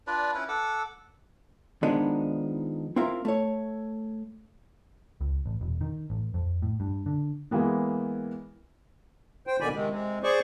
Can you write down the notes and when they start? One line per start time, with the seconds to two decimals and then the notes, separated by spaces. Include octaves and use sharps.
0.07 D4 F4 B4 D5
0.34 C#4 E4 B4
0.48 A4 F#5 D6 E6
1.83 D#3 F3 G#3 B3 D4 D#4
2.96 C4 E4 F4 A#4 E5
3.25 A3 C#5
5.21 C#2
5.46 A1
5.61 E1
5.81 D#3
6.10 A1
6.34 F2
6.62 A2
6.80 G2
7.06 D3
7.51 E3 G#3 A#3 B3
9.47 C5 G5
9.61 B2 D3 D#3 D5 G#5 B5
9.74 C3 D#3 G#3
9.90 C3 G#3
10.23 G#4 C5 D5 C#6